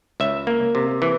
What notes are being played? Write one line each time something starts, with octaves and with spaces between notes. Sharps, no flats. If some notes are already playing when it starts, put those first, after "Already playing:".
C#2 E5
A#3
C3
E3